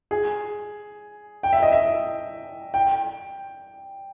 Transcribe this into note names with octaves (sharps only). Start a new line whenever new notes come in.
G#4
G5
E5
D#5
E5
G5